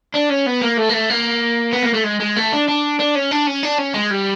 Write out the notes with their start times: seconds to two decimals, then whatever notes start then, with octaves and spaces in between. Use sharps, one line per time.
0.14 D4
0.29 C#4
0.46 B3
0.62 A#3
0.78 A3
0.89 A#3
0.94 A3
1.10 A#3
1.73 B3
1.83 A#3
1.94 A3
2.04 G#3
2.20 G#3
2.36 A3
2.53 D4
2.68 D4
3.00 D4
3.15 C#4
3.31 D4
3.47 C#4
3.63 D4
3.79 C#4
3.94 G#3
4.11 G3